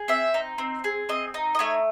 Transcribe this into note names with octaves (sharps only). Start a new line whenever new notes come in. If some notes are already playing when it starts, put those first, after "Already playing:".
Already playing: G#4
C4 E5
D#4
C4
G#4
C4 D#5
D#4
D#5
A3 C#5